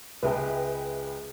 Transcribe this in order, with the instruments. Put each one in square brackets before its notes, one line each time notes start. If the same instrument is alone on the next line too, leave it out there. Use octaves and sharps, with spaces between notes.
[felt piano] C#2 G#3 [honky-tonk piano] B4 E5 G5